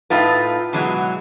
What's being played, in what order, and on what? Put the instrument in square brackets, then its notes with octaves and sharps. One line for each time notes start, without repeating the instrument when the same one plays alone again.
[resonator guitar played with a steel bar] A2 D#4 F4 B4
B2 E3 F#3 G#3